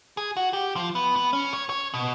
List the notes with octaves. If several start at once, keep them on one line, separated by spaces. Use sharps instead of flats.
G#4
F#4
G4
F3
B3
B3
C#4
C#5
C#5
B2